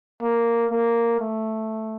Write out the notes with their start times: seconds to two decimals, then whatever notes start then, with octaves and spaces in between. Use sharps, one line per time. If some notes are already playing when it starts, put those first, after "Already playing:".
0.22 A#3
0.71 A#3
1.20 A3